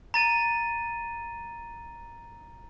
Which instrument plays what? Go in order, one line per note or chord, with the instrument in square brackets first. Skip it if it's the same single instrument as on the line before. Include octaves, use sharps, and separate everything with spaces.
[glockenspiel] A#5 A6 D#7